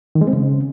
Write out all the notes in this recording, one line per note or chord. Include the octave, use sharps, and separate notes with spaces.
D#3
G#3
C4
C#3